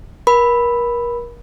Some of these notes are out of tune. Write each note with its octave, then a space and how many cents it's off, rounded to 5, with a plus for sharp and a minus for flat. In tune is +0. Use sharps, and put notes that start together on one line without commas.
A#4 +35 B5 +0